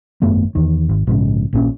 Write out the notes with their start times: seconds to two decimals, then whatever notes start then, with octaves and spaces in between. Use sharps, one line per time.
0.22 G#1 F#2 A3 B3
0.55 E2 D#3
0.89 G#1
1.07 A#1 G#2 C#3
1.53 A#1 A#2 C#4